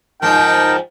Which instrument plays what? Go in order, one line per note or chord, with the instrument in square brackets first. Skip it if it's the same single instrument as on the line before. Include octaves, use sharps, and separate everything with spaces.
[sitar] G#2 F3 [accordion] D#4 A#4 [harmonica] G5 [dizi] A5